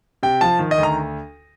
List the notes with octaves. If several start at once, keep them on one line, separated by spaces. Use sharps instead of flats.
C3 G5
F3 A5
D#3
D#5
D2
A#5